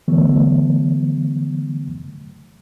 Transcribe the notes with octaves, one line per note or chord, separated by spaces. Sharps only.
D3 E3 F#3 A3 B3